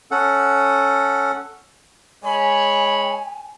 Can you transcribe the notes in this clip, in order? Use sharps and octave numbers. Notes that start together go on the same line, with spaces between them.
C#4 A4 F#5
G#3 C#5 G#5 B5